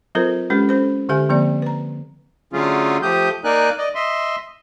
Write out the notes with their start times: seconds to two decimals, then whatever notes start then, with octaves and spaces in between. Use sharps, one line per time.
0.15 F#3 C4 F4 A4 A#4 C5
0.50 G#3 C#4 G4 A4 B4
0.69 C#4 A4 C5
1.09 D3 G4 A4 E5 G#5
1.29 D3 F3 A#3 C4 D5
1.62 B4 A#5
2.53 D3 F#3 A3 C#4 F4 G#4
3.02 F3 A3 G4 D#6 G6
3.45 A#3 D#4 A#4 D5 G#5 F#6
3.78 D5 D#5
3.95 D#5 E5 C6